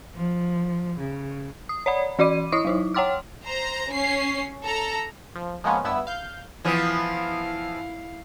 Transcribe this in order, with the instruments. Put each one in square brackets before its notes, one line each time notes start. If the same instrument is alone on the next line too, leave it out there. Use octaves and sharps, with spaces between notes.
[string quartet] F3
C#3
[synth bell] D#6
C#5 D5 F#5 B5
E3 F#4 D5 B5 D6 D#7
E4 D#5 C#6 D#6
F#3 D#4 E4
C#5 F#5 G5 C6 D6 F6
[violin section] C5 A#5
C#4 C7
A4 A#5
[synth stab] F3
F3 G#3 A#3 B3 C#4
G2 B3 E4 E6
F5 G6
[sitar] E3 F3 B3 [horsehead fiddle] E4 F5